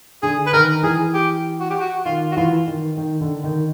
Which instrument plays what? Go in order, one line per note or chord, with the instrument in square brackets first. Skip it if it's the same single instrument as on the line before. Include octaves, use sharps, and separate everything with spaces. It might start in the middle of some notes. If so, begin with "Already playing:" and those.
[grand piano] D3 [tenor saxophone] G#4
[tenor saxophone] B4
[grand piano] D#3 [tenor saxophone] A#4
[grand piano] E3 [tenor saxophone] G#4
[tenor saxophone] G4
F#4
G4
F#4
[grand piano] D#3 [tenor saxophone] F4
[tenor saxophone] F#4
[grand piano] E3 [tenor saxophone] F4
[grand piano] D#3
D#3
D3
D#3